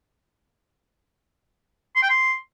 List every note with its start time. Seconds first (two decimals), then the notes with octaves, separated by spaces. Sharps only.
1.95 C6
2.02 G5
2.09 C6